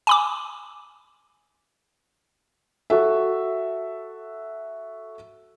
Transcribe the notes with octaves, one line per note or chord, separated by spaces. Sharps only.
G#5 B5 D6
F#4 A4 E5